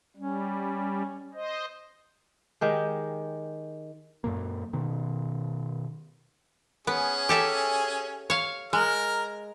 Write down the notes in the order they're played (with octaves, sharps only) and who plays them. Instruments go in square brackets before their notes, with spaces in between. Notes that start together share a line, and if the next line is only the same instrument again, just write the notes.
[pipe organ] G3 [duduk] C#4
[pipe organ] C5 D#5
[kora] D#3 G#3 G4
[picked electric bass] F#2 A#2 A#3
B2 D#3
[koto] B3 [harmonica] C#4 G#4
[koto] G4 A4 E5
C#5 F5
[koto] G#3 [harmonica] A#4 F6